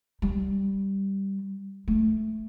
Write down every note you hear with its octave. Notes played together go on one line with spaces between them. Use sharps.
G3
A3